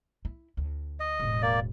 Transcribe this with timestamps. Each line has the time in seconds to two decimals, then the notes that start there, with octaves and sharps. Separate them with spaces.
0.25 E4
0.57 D2
1.00 D#5
1.20 E1 A2
1.42 A#3 D5